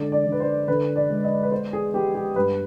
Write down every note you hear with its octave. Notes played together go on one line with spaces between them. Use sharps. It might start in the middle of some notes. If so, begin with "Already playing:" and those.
Already playing: D3 G#3 D5
D5
D3
B4
C5
D3 B4
D5
G#3
D#5
B4
B3 C5
G#4
B3 G4
G4
G2 B4